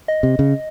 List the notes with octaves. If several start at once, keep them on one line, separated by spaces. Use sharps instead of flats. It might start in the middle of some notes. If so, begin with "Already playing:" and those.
D#5
C3
C#3